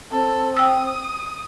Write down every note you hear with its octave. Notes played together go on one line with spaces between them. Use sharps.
C4 A4
G5 D#6 E6